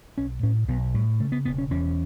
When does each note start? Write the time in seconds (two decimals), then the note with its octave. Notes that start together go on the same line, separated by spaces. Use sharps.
0.17 B1 C#4
0.43 A2 C#4
0.68 B1 B3
0.94 A2 G3
1.20 C#3 A3
1.32 B3
1.45 E1 B3
1.58 C#4
1.71 E2 C#4